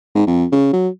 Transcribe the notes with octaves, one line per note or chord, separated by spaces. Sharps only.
G#2
F2
C#3
F#3